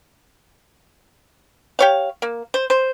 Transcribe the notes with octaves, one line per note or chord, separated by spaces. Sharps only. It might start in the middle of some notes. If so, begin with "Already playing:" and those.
G4 C#5 F5
A#3
C5
C5